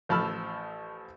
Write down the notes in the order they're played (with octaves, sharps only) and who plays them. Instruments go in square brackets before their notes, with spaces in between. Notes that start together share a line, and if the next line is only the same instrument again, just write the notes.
[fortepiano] A1 F3 A5 B5 E6 F6